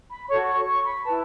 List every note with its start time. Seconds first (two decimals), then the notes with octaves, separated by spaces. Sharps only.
0.10 B5
0.28 F#4 A4 C#5 C#6
0.48 C#6
0.67 C#6
0.85 B5
1.04 E4 B4 A5